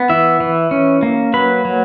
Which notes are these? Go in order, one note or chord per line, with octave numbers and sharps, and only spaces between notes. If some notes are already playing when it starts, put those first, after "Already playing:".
Already playing: B3
E3 E4 E5
E3
C#4
A#3
F#3 B4 B5
F#3